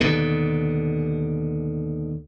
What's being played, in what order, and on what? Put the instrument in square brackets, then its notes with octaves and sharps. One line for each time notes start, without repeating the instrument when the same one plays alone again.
[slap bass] D#2 B2 D3